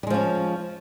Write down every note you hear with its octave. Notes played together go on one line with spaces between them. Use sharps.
F3 G3 G#3 C#4